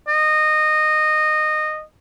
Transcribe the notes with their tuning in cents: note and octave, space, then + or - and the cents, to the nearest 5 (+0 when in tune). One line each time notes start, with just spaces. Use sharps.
D#5 -20